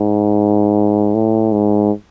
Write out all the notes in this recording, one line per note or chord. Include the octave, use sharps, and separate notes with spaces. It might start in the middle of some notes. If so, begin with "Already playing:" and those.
Already playing: G#2
A2
G#2